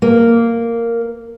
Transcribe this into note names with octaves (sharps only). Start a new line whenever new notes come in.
A#3